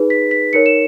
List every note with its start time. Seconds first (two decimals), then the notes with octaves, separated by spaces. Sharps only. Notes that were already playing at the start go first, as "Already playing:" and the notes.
Already playing: D#4 G#4 B4
0.10 B6
0.31 B6
0.53 D#4 A#4 C#5 C#7
0.66 E7